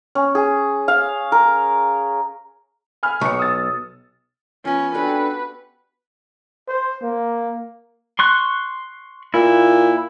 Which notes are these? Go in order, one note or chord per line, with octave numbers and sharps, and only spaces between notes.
C#4
G#4
F5
A#4
G#5 B5 F6
B1 C#6 C#7
D#6 E6 A6
F3 B3 C#4 G#5
D4 F#4 G4 A4 B4 F#5 G5
C5
A#3
C6 C#6 F#6
A#2 E4